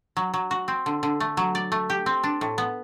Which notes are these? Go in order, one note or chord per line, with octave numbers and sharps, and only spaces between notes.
F#3
F#3
F#4
C4
D3
D3
A3
F#3
D5
A3
G4
C4
D4
A2
B3